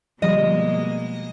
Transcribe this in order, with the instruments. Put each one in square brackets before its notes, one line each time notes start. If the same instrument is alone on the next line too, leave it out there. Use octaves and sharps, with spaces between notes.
[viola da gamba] B2 G#3 A#3 [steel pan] D3 F3 G3 [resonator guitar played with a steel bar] D#5